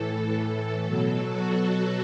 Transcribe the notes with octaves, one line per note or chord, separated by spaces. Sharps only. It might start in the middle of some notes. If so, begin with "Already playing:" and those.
Already playing: A2 E3 A4
A4
B2 F#3
F#4